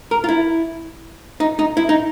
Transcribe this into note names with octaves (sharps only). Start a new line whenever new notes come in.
A#4
F4
E4
D#4
D#4
E4
D#4